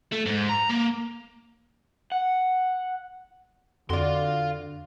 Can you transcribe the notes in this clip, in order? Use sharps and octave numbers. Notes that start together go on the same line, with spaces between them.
A3
G#2
A#5
A#3
F#5
F2 D3 F#4 D5 F5 C6